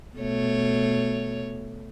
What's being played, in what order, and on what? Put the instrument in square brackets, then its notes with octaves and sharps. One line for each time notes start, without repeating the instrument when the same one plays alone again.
[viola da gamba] B2 A3 C#5